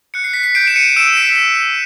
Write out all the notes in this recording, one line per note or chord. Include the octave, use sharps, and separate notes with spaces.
F#6 C#7
C7
B6
C7
G6 C7 D7
E7
C#7 D#7
E6 D7 E7
B6